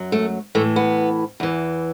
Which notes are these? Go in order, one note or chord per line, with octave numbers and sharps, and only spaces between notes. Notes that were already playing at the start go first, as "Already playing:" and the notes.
Already playing: F#2 F#3
A3
A2 E3 A3
B3
E2 E3